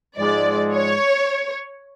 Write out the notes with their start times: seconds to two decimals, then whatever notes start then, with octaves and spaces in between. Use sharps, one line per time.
0.17 G#2 F3 G#3 D5
0.73 C#5